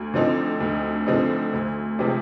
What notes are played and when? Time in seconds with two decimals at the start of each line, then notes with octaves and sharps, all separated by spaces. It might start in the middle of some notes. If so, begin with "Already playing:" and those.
Already playing: D2
0.14 D3 F3 C4 D#4
0.60 D2
1.06 D3 F3 C4 D#4
1.53 D2
1.99 C3 F3 G#3